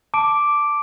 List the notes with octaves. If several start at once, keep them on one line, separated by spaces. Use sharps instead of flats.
A5 D6 D7